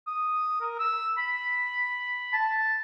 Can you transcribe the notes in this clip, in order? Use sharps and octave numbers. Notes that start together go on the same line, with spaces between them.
D#6
A#4
E6
B5
A5